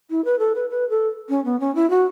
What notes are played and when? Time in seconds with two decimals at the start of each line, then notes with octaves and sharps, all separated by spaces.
0.10 E4
0.25 B4
0.39 A4
0.55 B4
0.70 B4
0.90 A4
1.29 C#4
1.45 B3
1.60 C#4
1.75 E4
1.90 F#4